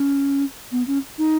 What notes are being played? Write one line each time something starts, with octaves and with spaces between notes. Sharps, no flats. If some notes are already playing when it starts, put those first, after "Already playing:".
Already playing: C#4
B3
C#4
D#4